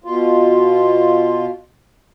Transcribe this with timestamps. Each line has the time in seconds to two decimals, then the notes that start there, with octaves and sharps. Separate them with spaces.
0.04 B2 F4